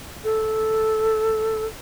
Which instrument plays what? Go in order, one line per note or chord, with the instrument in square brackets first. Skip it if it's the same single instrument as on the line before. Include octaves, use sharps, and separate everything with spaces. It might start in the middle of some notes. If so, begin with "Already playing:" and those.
[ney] A4